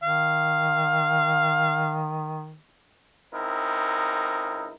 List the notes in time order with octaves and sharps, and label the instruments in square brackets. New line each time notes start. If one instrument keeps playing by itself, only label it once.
[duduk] D#3 [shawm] F5
[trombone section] C#2 C4 D#4 E4 A#4